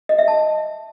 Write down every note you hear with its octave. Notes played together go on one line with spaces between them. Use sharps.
D#5
E5
A5